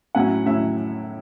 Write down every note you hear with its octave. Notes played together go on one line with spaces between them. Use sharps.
A2 F#3 C#4 E4 F#5
A2 F#3 C#4 E4 E5